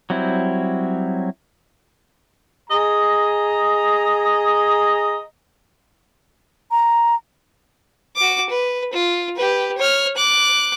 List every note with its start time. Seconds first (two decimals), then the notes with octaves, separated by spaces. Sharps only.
0.10 F#3 G3 C4 E4
2.70 G#4 D#5 A#5
6.71 A#5
8.16 F#4 D6
8.50 B4
8.93 F4
9.36 G4 B4
9.78 C#5 F6
10.16 D6 F#6